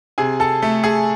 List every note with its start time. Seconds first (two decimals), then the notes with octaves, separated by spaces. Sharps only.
0.18 C3 G#4 G#5
0.40 A4 A5
0.62 A3
0.84 G#4 G#5